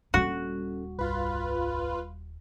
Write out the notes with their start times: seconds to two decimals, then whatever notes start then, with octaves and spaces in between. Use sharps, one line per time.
0.14 D#1 G3 C#4 F#4 A4
0.99 C2 G2 F4 B4